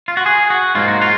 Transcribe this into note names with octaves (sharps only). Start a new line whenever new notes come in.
F4
F#4
G#4
F#4
G#2 F#3 A#3 F4
F#4
F4